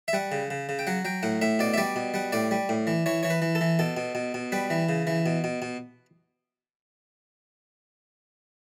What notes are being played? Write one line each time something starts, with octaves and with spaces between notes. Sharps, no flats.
E5
G3 F#5
C#3
C#3
C#3
G5
F#3 F#5
F#3 G5
A2 F#5
A2 E5
B2 D5
E5
G3 D5
B2
G3 F#5
A2 D5
G3
A2
E3
E3 C#5
E3 C#5
B4
E3
A4
E3
B2 A4
B2
B2
B2
G3 B4
E3
C#3
E3
B2
B2
B2